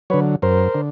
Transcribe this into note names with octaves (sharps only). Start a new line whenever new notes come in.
D3 F#3 B4 C#5
F#2 A#4 C5
D3